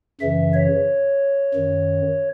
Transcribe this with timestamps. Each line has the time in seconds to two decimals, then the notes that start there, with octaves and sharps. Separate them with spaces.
0.20 F#2 C#3 E3 E5
0.54 C#5
1.55 F#2 D#3